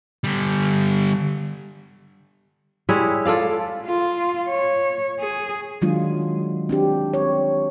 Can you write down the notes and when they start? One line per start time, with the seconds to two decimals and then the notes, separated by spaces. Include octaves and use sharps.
0.24 D3 G3
2.89 G3 G#3 E4 C#5
3.25 F4 A4 D5 F5
3.86 F4
4.50 C#5
5.20 G#4
5.82 D#3 F#3 G#3 D4 F4
6.69 C4 D4 G4
7.14 C#5